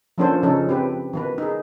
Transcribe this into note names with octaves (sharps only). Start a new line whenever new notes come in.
F3 A#3 C#4 D4 A4 C5
C#3 F3 C#4 D#4 A4
C4 G4 B4
D#3 B3 B4
D#4 G#4